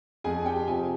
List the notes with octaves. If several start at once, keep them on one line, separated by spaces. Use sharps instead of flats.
F2 G#4 G#5
G4 G5
C3 F3 G#4 G#5